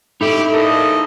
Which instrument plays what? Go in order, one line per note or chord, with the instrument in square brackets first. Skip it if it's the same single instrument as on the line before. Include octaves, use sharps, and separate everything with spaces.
[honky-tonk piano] A2 [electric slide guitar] D#4 E5 [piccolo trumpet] G4
[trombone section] A#1 A4 A#4 [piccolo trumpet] D#5